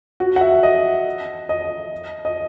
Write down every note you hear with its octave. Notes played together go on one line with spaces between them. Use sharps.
F#4
F#5
E5
D#5
D#5
D#5